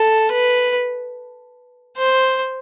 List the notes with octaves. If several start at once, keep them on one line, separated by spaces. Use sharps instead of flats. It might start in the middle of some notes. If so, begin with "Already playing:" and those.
Already playing: A4
B4
C5